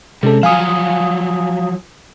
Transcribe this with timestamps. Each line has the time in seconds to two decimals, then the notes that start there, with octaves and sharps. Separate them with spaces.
0.23 C3 G#3 C#4 A4
0.43 F3 F#3 F5 G#5 D#6